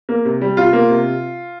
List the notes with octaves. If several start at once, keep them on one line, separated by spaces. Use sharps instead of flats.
A#3
C3
G3
C3 F4
A#3
C3